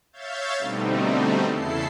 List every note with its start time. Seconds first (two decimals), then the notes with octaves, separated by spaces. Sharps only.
0.13 C#5 E5 F5 G6 A6
0.59 B2 D3 G3 A3 C4 D#4
1.50 E2 C#3 E4 A4 C7